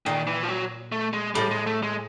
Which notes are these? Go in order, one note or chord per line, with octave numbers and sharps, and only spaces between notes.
A#2 D#3
E3
F3
F#3
A3
G#3
A2 G3
G#3
A3
G#3